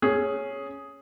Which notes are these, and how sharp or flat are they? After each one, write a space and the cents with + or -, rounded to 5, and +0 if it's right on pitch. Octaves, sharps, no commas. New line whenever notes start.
C#4 +0 G#4 +0